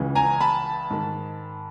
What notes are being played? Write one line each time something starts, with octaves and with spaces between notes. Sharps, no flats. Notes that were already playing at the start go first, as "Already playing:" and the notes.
Already playing: C#2 C#3 E3
G#5 A#5
A5 B5
G#2 D#3